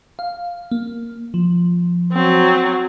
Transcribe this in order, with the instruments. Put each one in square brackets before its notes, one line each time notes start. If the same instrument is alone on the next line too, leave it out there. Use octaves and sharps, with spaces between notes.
[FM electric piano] F5
A#3
F3
[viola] F#3 C4